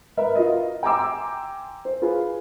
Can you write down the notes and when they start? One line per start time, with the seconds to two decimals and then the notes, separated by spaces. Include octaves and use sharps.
0.17 A#4 B4 E5
0.36 F4 F#4 D#5
0.83 G5 G#5 A#5 C6 D6 E6
1.85 C5
2.02 F4 G#4 B4